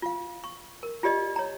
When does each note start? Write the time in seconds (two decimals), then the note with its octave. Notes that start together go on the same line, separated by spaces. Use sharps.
0.02 F4 F5
0.44 C#6
0.83 A#4
1.03 F4 G4 D5 D#5
1.36 C#5 A#5